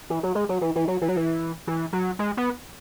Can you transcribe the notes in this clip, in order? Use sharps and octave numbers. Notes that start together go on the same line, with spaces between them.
E3
F#3
G#3
F#3
E3
E3
F#3
E3
F#3
E3
E3
F#3
G#3
B3